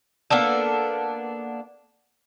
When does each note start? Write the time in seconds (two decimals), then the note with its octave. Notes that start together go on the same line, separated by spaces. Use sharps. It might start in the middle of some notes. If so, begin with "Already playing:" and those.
0.30 A#3 B3 D4 A4